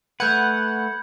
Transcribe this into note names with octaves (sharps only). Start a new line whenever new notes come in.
A3 B4 F#5 B5 G6 G#6